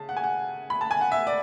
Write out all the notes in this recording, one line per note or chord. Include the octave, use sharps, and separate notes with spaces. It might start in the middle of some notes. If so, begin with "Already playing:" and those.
Already playing: C#3 A5
F#5
G#5
F#5
B5
A5
G#5
F#5
E5
D5